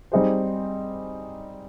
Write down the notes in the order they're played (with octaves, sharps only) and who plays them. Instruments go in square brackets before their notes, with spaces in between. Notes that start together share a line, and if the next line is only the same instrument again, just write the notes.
[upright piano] G3 C4 D#4 G#4 C5